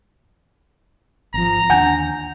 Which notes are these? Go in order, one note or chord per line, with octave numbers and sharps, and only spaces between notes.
G#1 F3 A#5
D#2 D3 D4 F#5 G#5 G6